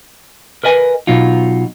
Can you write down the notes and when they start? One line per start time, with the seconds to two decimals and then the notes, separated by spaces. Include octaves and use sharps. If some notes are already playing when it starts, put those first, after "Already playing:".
0.64 A#4 B4 D#5 G#5
1.07 B2 F#3 D#4 F4